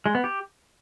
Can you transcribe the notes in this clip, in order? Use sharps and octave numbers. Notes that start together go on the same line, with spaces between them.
G#3
B3
G4